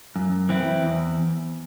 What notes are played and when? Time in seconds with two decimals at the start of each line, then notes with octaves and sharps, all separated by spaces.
0.16 F#2
0.49 E3 C4 E4
0.82 E2